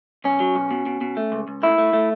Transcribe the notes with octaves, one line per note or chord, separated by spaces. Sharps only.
B1 C#4
F#3
B1
B2
B2
B2
A3
C#2
C#2
A3 E4
A3
A3